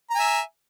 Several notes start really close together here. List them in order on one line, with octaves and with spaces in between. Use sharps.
A#5 G#5 E5